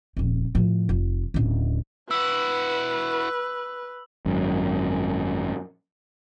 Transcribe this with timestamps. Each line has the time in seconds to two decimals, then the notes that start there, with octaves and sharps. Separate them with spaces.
0.17 D#1 F2
0.55 A2 F3
0.89 F1
1.34 D1 C#3
2.11 E4 F#4 B4 E6
4.26 G#1 F#2